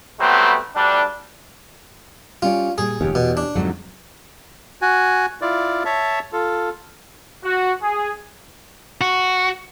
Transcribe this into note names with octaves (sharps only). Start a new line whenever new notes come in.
F#3 G3 A3 B3 C4
D2 G3 D4
G3 C#4 F4 D5
A#2 G3 G#4
F1 D#2 C#4 G4
E2 B2
D4
F2 G#2 D3 F#3 A3
F#4 G#5
E4 F4 D5
C#5 E5 A5
F4 A4
F#4
G#4
F#4